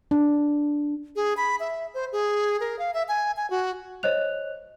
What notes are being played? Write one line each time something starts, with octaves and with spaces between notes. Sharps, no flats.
D4
G#4
B5
E5
C5
G#4
A#4
F5
E5
G#5
G#5
F#4
C5 C#5 D#5 F#6 F7